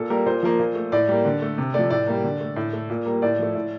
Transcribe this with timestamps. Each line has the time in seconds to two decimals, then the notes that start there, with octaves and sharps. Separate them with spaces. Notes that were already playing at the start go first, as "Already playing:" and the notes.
Already playing: A#2 A4
0.10 G3 A#3 A#4
0.26 A#2 C5
0.43 F3 A#3
0.59 A#2
0.76 A3
0.92 A2 D5
1.08 G3 A#3
1.25 D3
1.42 A3
1.58 C3
1.74 F3 A3 D5
1.90 A2 D5
2.07 G3 A#3
2.24 D3
2.40 A3
2.56 A2
2.73 A3
2.90 A#2
3.06 G3 A#3
3.22 A2 D5
3.39 F3 A3
3.55 A2